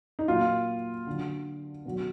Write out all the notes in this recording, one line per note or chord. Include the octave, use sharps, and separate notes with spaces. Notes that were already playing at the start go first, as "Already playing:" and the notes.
D#4
A#2 F#3 F4
D3 F#3
B2 F#3